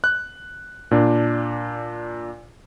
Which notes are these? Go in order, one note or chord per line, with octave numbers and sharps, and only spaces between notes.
F#6
A#2 D4